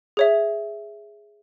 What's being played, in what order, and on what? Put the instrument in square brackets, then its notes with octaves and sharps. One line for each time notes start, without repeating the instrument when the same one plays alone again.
[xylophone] G#4 C#5 E5